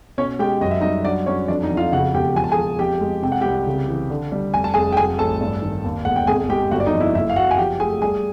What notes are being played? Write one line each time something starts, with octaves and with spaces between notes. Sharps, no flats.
B2 C#4 C#5
G#3 G4 G5
F#2 D#5
E5
G3 D#4 D#5
F#3 D4 D5
F#3 C#4 C#5
F2 D4 D5
D#4 D#5
F2
F4 F5
C#3 F#4 F#5
E1 G4 G5
F3 G#5
A5
G#4 G#5
F3
F2 G4 G5
G#3
C3 G5
F#5
C2 G4 G5
C#3
E3
D3
G3
F1 G#5
A5
F1 G#4 G#5
G5
F#3 G#4 G#5
A1 A4 A5
G2
D#3
D#2
E1 F#5
G5
G#1 G#4 G#5
G#3 G4 G5
G1 F#4 F#5
D5
D#4 D#5
F2
E4 E5
F#1 E4 E5
F5
F#1 F#4 F#5
G#5
F3 G4 G5
A3 G#4 G#5
G3 G#4 G#5